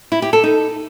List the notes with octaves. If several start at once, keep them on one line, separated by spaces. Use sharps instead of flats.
E4
G4
A4
D#4